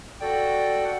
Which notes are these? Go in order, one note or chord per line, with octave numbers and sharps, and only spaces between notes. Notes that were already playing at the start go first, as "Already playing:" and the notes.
F#4 A4 D5 G5
F#5